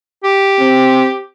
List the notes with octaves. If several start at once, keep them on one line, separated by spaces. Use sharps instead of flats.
G4
C4